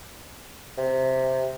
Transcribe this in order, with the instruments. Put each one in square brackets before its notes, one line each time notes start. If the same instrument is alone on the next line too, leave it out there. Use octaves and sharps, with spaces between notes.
[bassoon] C3